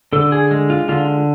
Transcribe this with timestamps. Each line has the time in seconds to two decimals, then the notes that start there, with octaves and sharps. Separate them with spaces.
0.13 D3 A4
0.32 G#4
0.51 G#3
0.70 F4
0.89 D3 F4